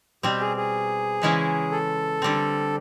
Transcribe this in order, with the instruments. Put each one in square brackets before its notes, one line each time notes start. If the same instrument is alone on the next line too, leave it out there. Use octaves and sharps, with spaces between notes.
[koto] B2 G3 C4 [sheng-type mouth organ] G4
[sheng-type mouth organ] G#4
G#4
[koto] C#3 E3 G#3 C#4 E4
[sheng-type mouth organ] A4
[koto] D3 G3 C4